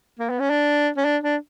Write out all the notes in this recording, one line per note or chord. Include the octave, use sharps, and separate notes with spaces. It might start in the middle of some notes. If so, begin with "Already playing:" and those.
A#3
B3
C#4
D4
C#4
D4
D4